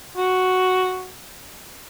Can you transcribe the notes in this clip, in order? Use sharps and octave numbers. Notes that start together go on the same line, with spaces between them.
F#4